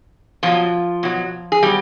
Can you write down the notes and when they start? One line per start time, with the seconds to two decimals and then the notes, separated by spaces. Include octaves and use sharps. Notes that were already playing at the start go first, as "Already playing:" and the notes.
0.43 B2 F3 F#3 F4
1.03 B2 F#3
1.52 G#4
1.62 B2 F#3 G3 G4